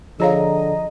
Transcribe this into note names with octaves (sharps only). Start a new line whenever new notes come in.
D3 F3 G#4 C#5 D#5 F5 A#5